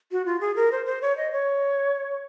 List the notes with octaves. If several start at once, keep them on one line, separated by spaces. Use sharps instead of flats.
F#4
F4
G#4
A#4
C5
C5
C#5
D#5
C#5